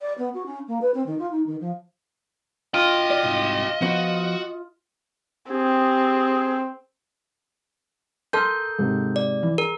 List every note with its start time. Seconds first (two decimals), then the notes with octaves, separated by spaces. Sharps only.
0.01 D5
0.18 B3
0.34 F#4
0.46 C#4
0.68 A#3
0.82 B4
0.94 C4
1.06 D#3
1.19 F4
1.31 D#4
1.47 D#3
1.61 F3
2.74 F4 F#4 D#5 G5
3.10 D5
3.23 C2 G#2
3.82 F3 B3 F#4
5.50 C4 G4 G#4
8.33 A4 A#4 A5 C6 F6 G6
8.79 G#2 C3
9.16 D5
9.43 E3
9.58 G#4 A#4